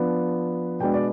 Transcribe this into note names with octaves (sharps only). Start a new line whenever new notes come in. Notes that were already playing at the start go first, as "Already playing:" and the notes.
Already playing: F3 B3 D4
B2 G#3 B3 D4 G5
D5